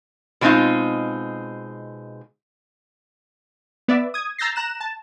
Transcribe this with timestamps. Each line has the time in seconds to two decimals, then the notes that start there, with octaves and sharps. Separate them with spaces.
0.41 B2 F#3 G#3 C4 D#4 F4
3.88 B3 D5 E5
4.14 D#6 G#6
4.38 A#5 E6 G6 A6 A#6 C7
4.56 A#5 F#6 E7
4.81 A5